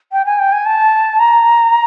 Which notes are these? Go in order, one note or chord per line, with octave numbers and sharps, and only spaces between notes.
G5
G#5
G5
G#5
A5
A#5